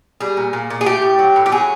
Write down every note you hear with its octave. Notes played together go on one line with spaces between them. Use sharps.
G3 G#4
A#2
A#2
A#2
G#4
A3 G4
A2
F#3
A2
G4
F#3 G#4